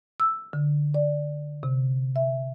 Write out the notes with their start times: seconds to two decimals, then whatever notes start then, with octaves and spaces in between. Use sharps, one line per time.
0.20 E6
0.53 D3
0.94 D5
1.63 C3
2.16 E5